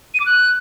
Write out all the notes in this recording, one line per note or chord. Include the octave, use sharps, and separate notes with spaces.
D#7
D6
F#6